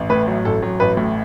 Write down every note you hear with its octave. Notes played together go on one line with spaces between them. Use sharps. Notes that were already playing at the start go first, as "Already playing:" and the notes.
Already playing: A1
A2 B4
F#3
A1 A4
F#3
A1 B4
A2